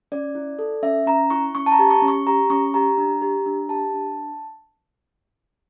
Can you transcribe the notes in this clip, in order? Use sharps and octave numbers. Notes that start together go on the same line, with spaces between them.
C#4 D5
E4
A4
C#4 E5
C#4 A#5
E4 C#6
C#4 C#6
A5
A#5
G4
C#6
C#4
C#6
G4 A#5
C#4 C#6
G4 A#5
D4
G4
D4
G4 A5
D4